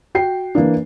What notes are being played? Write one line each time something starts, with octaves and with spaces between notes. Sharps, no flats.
F#4 G5 C7
E3 A#3 D4